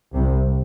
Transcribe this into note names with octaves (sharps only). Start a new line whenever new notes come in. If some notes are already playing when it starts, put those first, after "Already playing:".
C2 C3